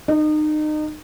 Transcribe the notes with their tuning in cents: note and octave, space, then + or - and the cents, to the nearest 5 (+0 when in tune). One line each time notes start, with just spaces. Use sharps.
D#4 -30